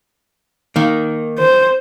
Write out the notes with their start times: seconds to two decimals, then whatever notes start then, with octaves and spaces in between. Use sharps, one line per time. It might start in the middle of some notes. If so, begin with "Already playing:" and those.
0.76 D#3 A#3
1.39 C5